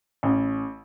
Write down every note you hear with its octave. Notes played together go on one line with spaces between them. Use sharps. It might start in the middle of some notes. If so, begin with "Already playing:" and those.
A1